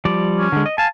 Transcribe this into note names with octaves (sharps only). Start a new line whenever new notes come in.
F3 G3 D5
C#4
D3 G#3
D#5
F5 G#5 A5